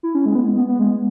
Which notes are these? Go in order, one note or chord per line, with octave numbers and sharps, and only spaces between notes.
E4
C#4
G#3
B3
G#3
B3
B3
G#3